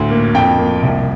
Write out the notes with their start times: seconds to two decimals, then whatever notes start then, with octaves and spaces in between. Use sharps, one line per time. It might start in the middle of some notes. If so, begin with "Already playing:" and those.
Already playing: D2 A2
0.10 A#3
0.34 F2 G5
0.58 A#3
0.83 C2